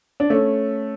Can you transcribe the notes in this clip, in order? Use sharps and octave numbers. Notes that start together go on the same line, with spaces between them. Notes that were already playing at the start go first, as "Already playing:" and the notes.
D4
A3 C#4